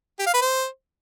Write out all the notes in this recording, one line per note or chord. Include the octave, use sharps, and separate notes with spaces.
G4
F5
B4
C5